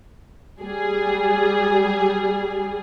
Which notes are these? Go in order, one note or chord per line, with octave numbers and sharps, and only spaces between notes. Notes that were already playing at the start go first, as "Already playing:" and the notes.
G3 G#4